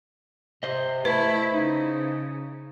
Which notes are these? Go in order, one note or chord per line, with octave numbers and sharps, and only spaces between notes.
C3 C5 D#5
A3 E4 B4
C#3 D#4